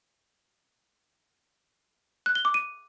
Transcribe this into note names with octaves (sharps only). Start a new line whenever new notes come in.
F#6
G7
D6
D#7